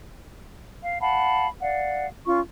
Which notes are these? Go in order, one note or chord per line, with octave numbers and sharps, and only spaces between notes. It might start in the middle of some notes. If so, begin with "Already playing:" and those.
F5
F5 F#5 A5 B5
D5 F5 F#5
C#4 F4 C#6